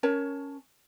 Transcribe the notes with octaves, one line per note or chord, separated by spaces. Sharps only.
C#4 A#4 C#5 A5